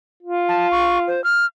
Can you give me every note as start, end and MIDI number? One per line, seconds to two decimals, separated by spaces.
0.23 1.21 65
0.49 0.70 81
0.71 0.99 85
1.08 1.24 72
1.24 1.45 89